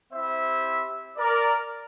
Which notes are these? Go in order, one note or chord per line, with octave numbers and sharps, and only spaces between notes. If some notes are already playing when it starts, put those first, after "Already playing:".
C4 E4 G4 C5 E5
A#4 D5